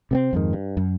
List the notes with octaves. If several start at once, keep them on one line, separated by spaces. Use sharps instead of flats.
C3 B3 C4
F2 G#2 D#3
G2
F#2